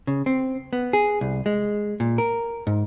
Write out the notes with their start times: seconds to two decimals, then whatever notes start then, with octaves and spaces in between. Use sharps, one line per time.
0.07 C#3
0.26 C4
0.73 B3
0.93 G#4
1.21 C2
1.46 G#3
2.00 A#2
2.18 A#4
2.67 G#2